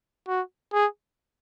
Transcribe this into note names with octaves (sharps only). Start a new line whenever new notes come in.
F#4
G#4